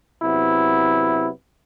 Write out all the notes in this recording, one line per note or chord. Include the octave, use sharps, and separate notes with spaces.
C3 F#3 B3 E4